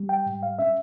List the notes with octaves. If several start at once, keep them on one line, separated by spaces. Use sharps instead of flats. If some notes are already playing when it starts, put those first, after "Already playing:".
Already playing: G3
G5
G#2
F5
C#4 E5